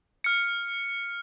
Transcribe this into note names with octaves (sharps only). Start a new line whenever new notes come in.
F6 C#7